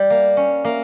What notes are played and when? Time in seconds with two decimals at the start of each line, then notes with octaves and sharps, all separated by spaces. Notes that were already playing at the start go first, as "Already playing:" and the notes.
Already playing: G3
0.10 A#3
0.37 C#4
0.65 A#3